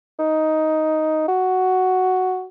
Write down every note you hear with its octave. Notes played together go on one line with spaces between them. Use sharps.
D#4
F#4